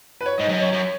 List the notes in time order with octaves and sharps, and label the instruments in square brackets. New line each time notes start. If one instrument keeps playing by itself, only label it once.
[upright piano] B4
C#5
[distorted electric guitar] G#2 [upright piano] D#5
[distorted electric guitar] F#2 [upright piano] D#5
[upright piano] C#5
[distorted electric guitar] F#2